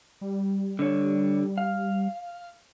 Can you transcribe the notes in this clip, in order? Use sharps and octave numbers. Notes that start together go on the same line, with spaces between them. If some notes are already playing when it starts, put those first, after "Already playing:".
G3
D3 C#5
F5